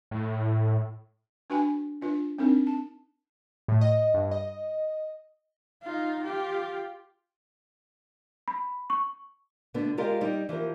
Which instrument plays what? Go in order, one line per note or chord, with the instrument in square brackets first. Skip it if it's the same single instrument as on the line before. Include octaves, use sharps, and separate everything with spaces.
[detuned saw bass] A2
[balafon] D4 F#4 B4 G5 G#5 B5
D4 F4 B4
C4 D4 D#4 A#4
A5
[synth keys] A2
D#5
G2
D#5
[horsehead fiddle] D#4 F4
F4 G4
[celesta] B5
C#6
[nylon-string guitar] B2 D3 A3 B3
G#3 F4 G4 A#4 D5 F5
G3 D#4 G4 D5
E3 F3 G4 A#4